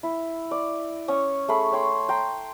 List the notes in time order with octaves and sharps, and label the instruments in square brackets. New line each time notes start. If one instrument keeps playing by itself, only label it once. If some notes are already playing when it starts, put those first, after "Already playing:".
[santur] E4
D5
C#4 C#5 C#6 D#6
A3 G#4 B5
C#5 G5 C6
G5 A#5 C6